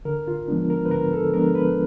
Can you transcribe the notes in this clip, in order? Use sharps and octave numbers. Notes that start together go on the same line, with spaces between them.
D3 A#4
F4
F3 G#3 B3 D4
A#4
B4
D3 A#4
A4
F3 G#3 B3 D4 A#4
B4